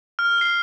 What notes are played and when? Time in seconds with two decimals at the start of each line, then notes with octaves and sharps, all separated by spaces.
0.19 F6
0.38 C7 G7